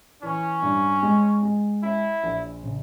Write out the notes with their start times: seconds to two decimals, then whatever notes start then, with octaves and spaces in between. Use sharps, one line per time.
0.22 E3 C#4
0.62 G2
1.03 G#3
1.43 G#3
1.83 C#4 E4
2.24 A#1
2.63 C#3